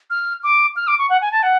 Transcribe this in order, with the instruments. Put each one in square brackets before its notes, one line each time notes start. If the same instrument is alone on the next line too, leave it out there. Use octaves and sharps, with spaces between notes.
[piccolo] F6
D6
F6
D6
C#6
F#5
G#5
A5
F#5